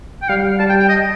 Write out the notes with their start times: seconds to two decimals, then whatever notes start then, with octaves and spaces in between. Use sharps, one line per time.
0.22 G5
0.29 G3 F5
0.60 G3 A5
0.69 G5
0.80 G5
0.89 D#5